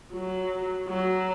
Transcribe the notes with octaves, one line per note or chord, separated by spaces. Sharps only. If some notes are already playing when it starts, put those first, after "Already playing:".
F#3
F#3